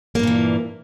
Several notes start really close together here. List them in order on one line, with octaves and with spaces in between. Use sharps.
A#3 G2 A#2 E3